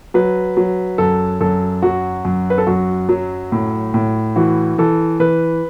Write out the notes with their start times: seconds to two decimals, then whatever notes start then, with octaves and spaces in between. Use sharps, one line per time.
0.14 F#3 B4
0.57 F#3
0.98 F#2 A4
1.41 F#2 A4
1.82 F#3 F#4
2.25 F#2
2.50 B4
2.58 A4
2.67 F#2 F#4
3.09 F#3
3.52 A2
3.94 A2
4.36 E3 F#4
4.78 E3 A4
5.20 E3 B4